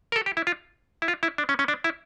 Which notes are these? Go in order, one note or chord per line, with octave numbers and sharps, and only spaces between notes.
A#4
A4
G4
E4
F4
E4
F4
E4
D4
C#4
C#4
D4
E4